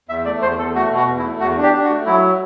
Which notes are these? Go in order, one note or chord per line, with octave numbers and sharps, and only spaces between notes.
E2 E5
A3 D5
E2 C5
E2 A4
A3 F#4
B2
F#4
E2
E4
A3
E2 F#4
D4
G4
D4
F#4
A3
F#3 E4